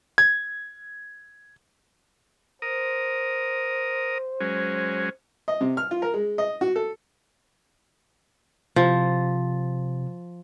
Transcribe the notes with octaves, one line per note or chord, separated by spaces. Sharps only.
G#6
A#4 C5 D#6
F#3 G#3 C#4
D#5
C3
F6
F4
A#4
G#3
D#5
F#4
A4
C3 F3